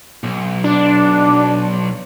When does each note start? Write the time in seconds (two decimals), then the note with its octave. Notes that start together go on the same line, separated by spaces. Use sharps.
0.24 B1
0.64 D4